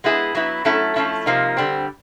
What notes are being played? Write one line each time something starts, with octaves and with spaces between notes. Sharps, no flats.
G#3 B3 E4 G#4
F#3 B3 E4
F#3 A3 C#4 E4 A4
F3 A3 C#4 E4
C3 F3 A#3 D#4
D3 G3 C4